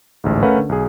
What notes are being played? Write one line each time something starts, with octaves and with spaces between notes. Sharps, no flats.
A1 D2 G#2
A3 C#4 A#4 B4 F5 F#5
D3
B1 G#4